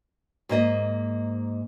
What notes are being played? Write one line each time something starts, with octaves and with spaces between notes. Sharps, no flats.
G#2 A#3 D#5